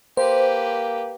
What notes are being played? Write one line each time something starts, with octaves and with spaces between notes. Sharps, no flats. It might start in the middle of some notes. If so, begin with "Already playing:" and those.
A#3 G4 B4 C5